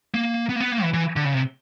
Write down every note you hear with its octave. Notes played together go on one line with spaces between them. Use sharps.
A#3
B3
A#3
B3
A#3
E3
E3
D3
C#3
C3